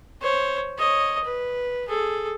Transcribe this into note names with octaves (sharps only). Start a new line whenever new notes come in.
C5 C#5
C#5 D#5
B4
G#4 A4